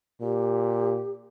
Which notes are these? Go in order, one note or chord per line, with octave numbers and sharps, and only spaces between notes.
A#2 G4